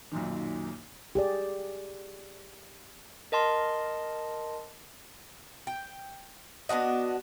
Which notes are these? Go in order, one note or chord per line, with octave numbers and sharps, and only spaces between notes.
B1 F#2 A#2 D#3
G4 G#4 D5
A#4 D#5 A5 C6
G5
B3 D4 F#4 D#5